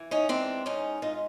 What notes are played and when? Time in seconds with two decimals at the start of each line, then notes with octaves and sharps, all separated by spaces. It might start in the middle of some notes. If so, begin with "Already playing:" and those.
Already playing: E3
0.11 C#4 D#4
0.29 G#2 C4 D4
0.66 G#2 C#4 D#4
1.02 G#2 D#4 F4